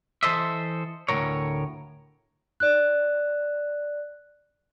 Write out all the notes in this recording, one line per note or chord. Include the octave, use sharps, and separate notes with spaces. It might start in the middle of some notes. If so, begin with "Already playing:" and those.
E3 A4 C5 D#5 E5
D2 A2 D#3 A#4 C#5
D5 F#6